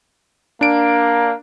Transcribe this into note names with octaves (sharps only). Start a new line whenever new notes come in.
A#3 D4 D7